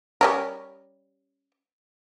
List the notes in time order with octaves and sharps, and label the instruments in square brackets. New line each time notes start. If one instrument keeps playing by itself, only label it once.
[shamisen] G3 C#4 A#4